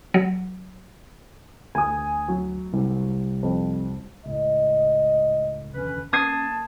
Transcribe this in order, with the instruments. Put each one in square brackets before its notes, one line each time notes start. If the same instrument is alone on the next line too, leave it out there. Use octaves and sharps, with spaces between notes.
[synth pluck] F#3
[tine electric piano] D2 [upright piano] G#5 D#6
[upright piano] F#3
[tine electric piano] C2
[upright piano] F2
[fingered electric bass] C#2 A2 [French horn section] D#5
[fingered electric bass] F1 D#2 D3 [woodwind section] E3 C#4 B4
[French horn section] A#3 [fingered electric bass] C#4 [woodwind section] A5 [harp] D#6 G#6 C7